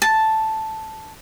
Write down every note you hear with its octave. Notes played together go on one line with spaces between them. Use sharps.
A5